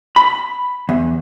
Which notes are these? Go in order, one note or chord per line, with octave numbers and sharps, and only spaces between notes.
B5
E2